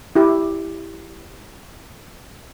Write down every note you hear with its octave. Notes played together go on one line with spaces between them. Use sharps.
E4 G4